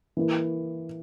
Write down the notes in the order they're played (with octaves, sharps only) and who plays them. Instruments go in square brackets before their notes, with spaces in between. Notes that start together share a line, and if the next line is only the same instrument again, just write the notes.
[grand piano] E3 A#3 E4